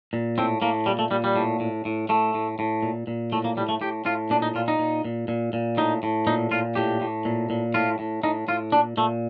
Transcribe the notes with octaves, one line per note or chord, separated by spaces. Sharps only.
A#2
A2 C4
A2 A#3
A#2 G3
A3
A#2 G3
G3
A2
A2
A2
A2 A3
A2
A2
A#2
A#2
A2 A3
A#3
A2 G3
A3
A2 G4
A2 F4
A#2 D4
D#4
A#2 F4
D#4
A#2
A#2
A#2
A#2
A2 D#4
A2
A#2 D#4
A#2 F4
A2 G4
A2
A#2
A#2
A2 F4
A2
A2 D#4
A2 F4
A#2 D4
A#2 A3